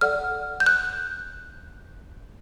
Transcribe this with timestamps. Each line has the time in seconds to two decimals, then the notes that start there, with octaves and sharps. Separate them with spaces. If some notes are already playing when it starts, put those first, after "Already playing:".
0.01 A4 D5 F#5 F6
0.60 G6
0.66 F#6